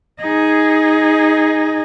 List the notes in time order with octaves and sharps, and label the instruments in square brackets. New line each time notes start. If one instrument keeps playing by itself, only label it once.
[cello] D#4 G#4